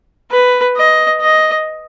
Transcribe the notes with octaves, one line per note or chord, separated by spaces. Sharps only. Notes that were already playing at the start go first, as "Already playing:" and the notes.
B4
D#5
D#5